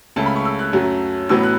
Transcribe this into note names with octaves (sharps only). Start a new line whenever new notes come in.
C#2 C#3 A3 C#4 A5
B5
C#6
E6
F#6
F#2 F#3 A3 C#4
A1 A2 F#3 B3 E6
F#6